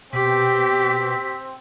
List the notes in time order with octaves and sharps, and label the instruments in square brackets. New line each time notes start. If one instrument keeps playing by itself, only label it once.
[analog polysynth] B2 [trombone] C4 [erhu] G4 [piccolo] B6